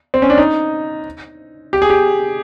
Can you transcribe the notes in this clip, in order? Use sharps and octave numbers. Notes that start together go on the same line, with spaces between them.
C4
C#4
D4
D#4
G4
G#4
G4